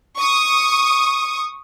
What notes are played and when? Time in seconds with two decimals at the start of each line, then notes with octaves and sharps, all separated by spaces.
0.18 C#6 D#6